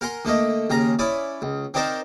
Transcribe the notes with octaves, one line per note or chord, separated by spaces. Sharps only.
A#4 F#5 G#5 C6
D3 A3 A#3 D#5
D#2 C#3 G#5 A#5
C#4 E4 D5 D#6
C#2
C4 D4 D#4 A#4 C5 A5